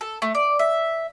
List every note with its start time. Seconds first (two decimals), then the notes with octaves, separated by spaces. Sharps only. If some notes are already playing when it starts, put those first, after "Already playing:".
0.01 A4
0.22 A3
0.35 D5
0.59 E5